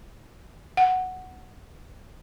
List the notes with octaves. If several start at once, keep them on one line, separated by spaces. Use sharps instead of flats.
F#5